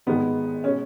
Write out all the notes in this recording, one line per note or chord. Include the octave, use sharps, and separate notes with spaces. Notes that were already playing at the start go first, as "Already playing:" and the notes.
G#1 G#2 D#3 G#3 B3
B2 G#3 C#4